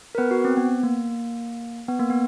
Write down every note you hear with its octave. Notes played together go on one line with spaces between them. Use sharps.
A#4
B3 B4
F#4
C4
B3
A#3
B3
A#3
B3